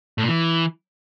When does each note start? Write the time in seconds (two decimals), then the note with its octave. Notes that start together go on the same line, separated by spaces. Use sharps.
0.18 A2
0.23 A#2
0.28 E3